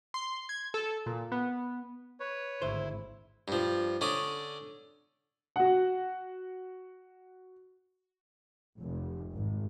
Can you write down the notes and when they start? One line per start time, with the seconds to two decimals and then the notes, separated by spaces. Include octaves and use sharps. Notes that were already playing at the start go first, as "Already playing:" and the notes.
0.14 C6
0.49 G#6
0.74 A4
1.06 A#2
1.32 B3
2.20 B4 C#5
2.62 G#1 D2 E4 C5
3.48 G2 F3
4.01 D3 C#4 D5 D#6
5.56 F#4 F#5
8.79 F1
9.32 G#1